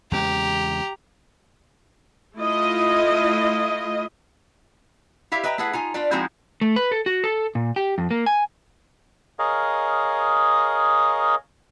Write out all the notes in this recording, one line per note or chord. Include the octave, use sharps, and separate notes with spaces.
E2 C#3 G#3 G4 A#5
A3 E4 F4 D#5
E4 G4 E5 F5
B4 D#5 E5 G5 A#5
A3 E4 G#4 B4 F#5
D#4 F4 G#5
D4 F4 B4 D5
F3 G#3 C4 D#4 E4 F#4
A3
B4
A4
F#4
A4
A#2
G4
F2
A#3
G#5
G#4 A#4 C#5 D#5 F5